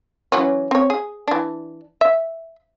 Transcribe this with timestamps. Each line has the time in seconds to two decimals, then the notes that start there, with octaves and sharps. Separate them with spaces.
0.32 E3 F#3 C#4
0.71 C4 C#5
0.90 G#4
1.28 E3 D4
2.01 E5